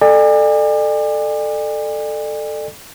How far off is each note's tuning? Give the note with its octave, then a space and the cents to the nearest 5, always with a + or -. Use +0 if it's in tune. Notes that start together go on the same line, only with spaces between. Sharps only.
A4 +0 D5 +35 G#5 -40